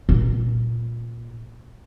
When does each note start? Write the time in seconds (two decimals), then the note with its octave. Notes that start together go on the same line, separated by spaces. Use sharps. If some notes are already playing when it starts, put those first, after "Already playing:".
0.09 A#2 C#4